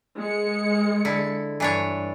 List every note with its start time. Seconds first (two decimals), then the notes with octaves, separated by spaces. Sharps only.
0.18 G#3 C#7
1.05 D3 E4
1.60 G2 E3 D4 C#5